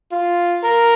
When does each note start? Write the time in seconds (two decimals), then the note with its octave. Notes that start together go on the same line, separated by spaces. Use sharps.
0.12 F4
0.63 A#4